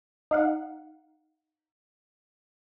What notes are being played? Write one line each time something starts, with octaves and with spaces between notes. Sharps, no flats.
D#4 F5 F#5